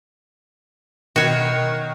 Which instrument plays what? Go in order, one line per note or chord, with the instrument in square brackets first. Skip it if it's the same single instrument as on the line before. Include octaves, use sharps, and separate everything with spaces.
[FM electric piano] B2 [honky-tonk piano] D#3 [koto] F#4 C#5